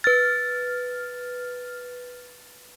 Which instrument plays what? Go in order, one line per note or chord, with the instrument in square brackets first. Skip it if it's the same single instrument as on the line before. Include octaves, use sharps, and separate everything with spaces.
[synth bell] B4 F6 [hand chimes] A6